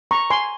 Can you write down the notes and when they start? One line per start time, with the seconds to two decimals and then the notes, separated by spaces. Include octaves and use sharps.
0.11 A#5 C#6
0.30 G#5 C6